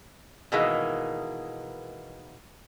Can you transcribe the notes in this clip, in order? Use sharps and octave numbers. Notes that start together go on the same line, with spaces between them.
B2 D#3 E3 G#3 A#3